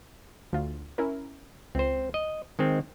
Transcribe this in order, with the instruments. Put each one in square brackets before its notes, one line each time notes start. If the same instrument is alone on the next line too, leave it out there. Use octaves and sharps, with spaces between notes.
[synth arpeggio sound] D2 F4
C#4 E4 A#4
[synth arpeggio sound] C#2 [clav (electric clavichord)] C4 C5
[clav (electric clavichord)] D#5
D#3 G#3 C4